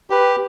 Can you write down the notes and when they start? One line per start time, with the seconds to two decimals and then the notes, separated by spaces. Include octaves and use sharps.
0.10 G4 B4